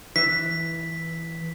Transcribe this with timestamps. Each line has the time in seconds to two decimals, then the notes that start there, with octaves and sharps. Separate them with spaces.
0.16 E3 B6